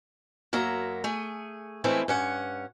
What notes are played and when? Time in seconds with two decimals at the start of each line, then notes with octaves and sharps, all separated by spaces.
0.53 F#2 F#3 A#3 E5 A#5
1.04 A3 G#4
1.84 E3 G#3 A3 C4 C#4 E4
2.08 G2 C#4 F#5